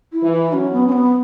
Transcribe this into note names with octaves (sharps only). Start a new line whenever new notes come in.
E4
E3
E4
F#3 C#4
B3
C#4
B3